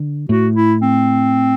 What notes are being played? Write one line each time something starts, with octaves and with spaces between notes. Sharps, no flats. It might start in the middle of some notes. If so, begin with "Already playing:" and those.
Already playing: D3
A2 F#4
E4
C4